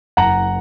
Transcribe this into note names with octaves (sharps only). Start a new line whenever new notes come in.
F#1 F#5 A#5